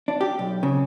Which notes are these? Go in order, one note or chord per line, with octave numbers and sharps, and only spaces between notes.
D4
G4
B1
C#3